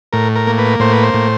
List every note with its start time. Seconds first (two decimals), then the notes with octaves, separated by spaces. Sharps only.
0.13 A2 A#4
0.36 A#4
0.47 A#3
0.58 B4
0.80 A2 C5
0.92 B4
1.03 C5
1.14 A2